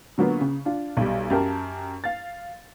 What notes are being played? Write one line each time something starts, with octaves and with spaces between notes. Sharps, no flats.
D3 F#3 A#3 B3 F4
C#3
D4 F4
B1 G3
F#2 G4 A#4 A5
F5 A6